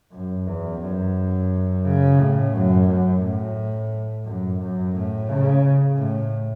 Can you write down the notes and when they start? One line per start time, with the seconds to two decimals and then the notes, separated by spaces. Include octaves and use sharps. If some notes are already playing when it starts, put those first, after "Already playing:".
0.12 F#2
0.46 E2
0.81 F#2
1.85 C#3
2.19 A2
2.53 F#2
2.88 F#2
3.22 A2
4.25 F#2
4.60 F#2
4.94 A2
5.29 C#3
5.97 A2